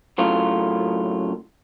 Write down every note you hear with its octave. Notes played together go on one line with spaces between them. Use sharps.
F#2 A2 C#3 F4